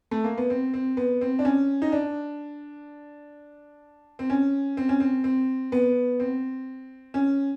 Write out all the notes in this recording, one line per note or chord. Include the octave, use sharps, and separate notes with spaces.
A3
A#3
B3
C4
C4
B3
C4
D4
C#4
D#4
D4
C4
C#4
C4
C#4
C4
C4
B3
C4
C#4